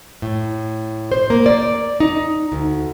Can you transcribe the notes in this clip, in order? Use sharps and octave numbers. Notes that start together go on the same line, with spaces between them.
A2
C5
A#3
D5
D#4
D2